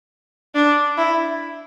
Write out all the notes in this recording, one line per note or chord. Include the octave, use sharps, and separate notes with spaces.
D4
E4